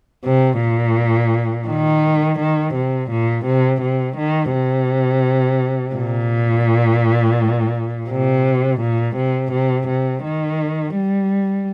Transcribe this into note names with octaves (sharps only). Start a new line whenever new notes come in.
C3
A#2
D#3
D#3
C3
A#2
C3
C3
D#3
C3
A#2
C3
A#2
C3
C3
C3
D#3
G3